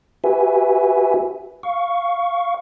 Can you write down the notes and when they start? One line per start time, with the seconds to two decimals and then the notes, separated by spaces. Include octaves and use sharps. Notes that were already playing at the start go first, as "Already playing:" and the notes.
0.24 F#4 G4 B4 E5 G#5
1.63 F5 C#6